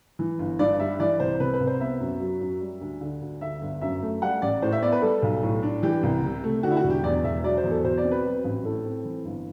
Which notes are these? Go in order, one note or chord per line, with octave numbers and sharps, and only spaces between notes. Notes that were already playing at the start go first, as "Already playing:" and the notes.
E3
G1
G2 D5
G3 E5
E3 D5
C2 C5
C3 B4
B4
C2
C5
B3 E5
F#2
F#3
F#2
G3
D2
D3
D2
D3 E5
G1
F#2 E5
A3
G3 F#5
A1 D5
A2 C5
E5
B3 D5
B4
G3 A4
B1
A2
D4
E3 G4
C2
C3
A3
D3 F#4
E4
F#4
E1
G4
E2 D5
E1 E5
F#3 D5
C5
E2
A4
B2 C5
D5
C4
B4
F#3
A1
A2 A4
C4
E3
G1